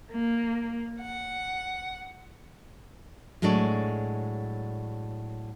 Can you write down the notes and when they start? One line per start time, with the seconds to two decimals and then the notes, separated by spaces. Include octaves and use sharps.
0.11 A#3
1.00 F#5
3.42 A2 F#3 G#3 D4 D5 G#5